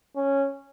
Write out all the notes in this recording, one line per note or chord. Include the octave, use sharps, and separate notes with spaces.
C#4